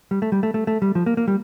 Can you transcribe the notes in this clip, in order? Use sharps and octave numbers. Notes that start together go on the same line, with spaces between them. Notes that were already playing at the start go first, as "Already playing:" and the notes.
G3
A3
G3
A3
A3
A3
G3
F3
A#3
A#3
G3